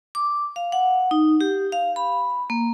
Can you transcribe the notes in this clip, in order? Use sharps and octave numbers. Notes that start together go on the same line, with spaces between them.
D6
F5
F#5
D#4
G4
F5
B5
A#3